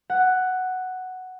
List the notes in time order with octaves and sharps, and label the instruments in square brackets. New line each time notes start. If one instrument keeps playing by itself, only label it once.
[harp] F#5